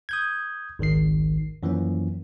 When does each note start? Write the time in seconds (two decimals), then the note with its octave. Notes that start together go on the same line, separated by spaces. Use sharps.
0.09 D#6 G6 G#6
0.79 G#1 C#2 D#3 C7
1.63 F#2 E3 F3 A#3 C#4